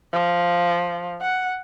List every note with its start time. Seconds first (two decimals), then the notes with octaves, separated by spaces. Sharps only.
0.13 F3
1.21 F#5